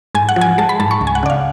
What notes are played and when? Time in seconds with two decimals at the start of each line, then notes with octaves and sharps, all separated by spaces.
0.15 G#2 G#5
0.29 F#5
0.36 F3
0.41 G#5
0.58 G#3 A5
0.69 B5
0.80 G#2 A5
0.91 C#6
1.01 C#2
1.07 G#5
1.15 F#5
1.23 C#3 D5
1.30 F5